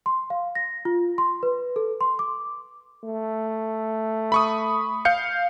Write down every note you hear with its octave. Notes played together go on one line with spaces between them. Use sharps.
C6
F5
A#6
F4
C6
B4
A4
C6
D6
A3
B5 C#6 D#6
F5 G6 C#7